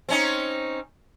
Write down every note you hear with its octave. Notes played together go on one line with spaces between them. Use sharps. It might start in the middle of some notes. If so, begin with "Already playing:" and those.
C4 C#4 D#4